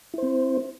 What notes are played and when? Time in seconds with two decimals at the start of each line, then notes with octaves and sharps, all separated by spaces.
0.14 E4
0.18 C5
0.23 C4